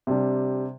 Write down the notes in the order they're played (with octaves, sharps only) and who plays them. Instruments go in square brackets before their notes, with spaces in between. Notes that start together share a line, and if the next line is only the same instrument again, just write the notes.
[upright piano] C3 G3 D4